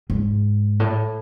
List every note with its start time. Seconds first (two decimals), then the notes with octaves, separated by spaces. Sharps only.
0.10 G#2
0.80 A2